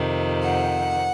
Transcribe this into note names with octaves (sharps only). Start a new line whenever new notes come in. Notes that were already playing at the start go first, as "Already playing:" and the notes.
Already playing: F2 C3 D#3
F#5